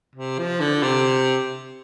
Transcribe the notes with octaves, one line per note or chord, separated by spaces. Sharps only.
C3
F3
D3
C3